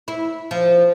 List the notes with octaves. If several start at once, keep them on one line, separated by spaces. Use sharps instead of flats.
E4
F3